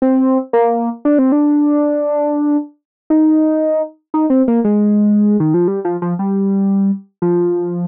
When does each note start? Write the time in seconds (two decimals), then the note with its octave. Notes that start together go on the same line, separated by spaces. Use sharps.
0.02 C4
0.53 A#3
1.05 D4
1.18 C4
1.32 D4
3.10 D#4
4.14 D#4
4.30 C4
4.48 A#3
4.64 G#3
5.40 D#3
5.54 F3
5.68 G3
5.85 F3
6.02 F3
6.19 G3
7.22 F3